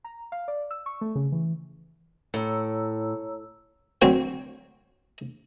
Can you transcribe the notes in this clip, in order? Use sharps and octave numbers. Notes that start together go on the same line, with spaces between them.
A#5
F5
D5
E6
C#6
A3
C#3
E3
A2 C#5 A#5 E6
D2 F#3 C4 C#5 G5